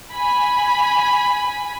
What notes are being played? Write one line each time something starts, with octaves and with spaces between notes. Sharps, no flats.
G#5 B5